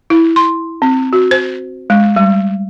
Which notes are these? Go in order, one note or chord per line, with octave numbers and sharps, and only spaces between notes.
E4
C6
C4
F#4
C5
G#3
G3